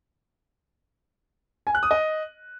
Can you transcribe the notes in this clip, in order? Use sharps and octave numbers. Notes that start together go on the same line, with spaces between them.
G#5
F#6
D#6
D#5